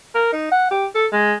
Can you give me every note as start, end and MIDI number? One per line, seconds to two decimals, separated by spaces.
0.15 0.28 70
0.33 0.50 63
0.52 0.69 78
0.71 0.86 67
0.95 1.06 69
1.12 1.35 56